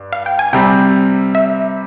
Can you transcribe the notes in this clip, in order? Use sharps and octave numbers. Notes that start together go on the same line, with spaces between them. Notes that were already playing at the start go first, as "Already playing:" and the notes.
Already playing: G2
F5
G5
G#5
C3 G3 C4 G5
E5